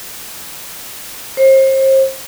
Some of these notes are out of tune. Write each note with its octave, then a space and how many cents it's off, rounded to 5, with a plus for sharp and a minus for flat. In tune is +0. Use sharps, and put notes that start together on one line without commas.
C5 +35